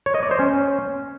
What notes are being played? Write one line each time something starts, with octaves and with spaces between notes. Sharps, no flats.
C#5
D#5
D5
C5
C#4